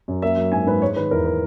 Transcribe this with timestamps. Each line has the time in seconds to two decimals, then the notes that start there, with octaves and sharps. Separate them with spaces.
0.08 F#2
0.22 A#3 E5
0.37 F#3
0.52 G#2 G#5
0.67 G#2 B4
0.82 G#3 C#5
0.96 D#3 B4
1.11 E2 A#4
1.26 B4